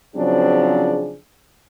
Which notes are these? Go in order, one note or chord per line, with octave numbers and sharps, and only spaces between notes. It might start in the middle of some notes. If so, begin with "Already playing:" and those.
C#3 F3 F#3 C4 D4 G#4